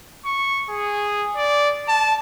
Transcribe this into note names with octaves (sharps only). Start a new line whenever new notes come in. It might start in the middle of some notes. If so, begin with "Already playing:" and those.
C#6
G#4
D5
A5